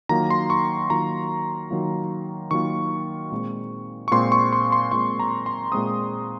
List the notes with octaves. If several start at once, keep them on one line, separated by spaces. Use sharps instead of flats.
D#3 F#3 A#3 F4 A#5
C6
C#6
D#3 F#3 A#3 F4 A#5
D#3 F#3 A#3 F4
D#3 F#3 A#3 F4 C#6
A#2 G#3 C4
C#6
A#2 G#3 C4 C6
C#6
C6
C6
A#2 G#3 C4 C#6
A#5
C6
A#2 G#3 C4 D#6